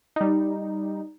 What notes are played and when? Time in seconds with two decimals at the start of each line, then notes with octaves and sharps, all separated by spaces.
0.16 G3 D#4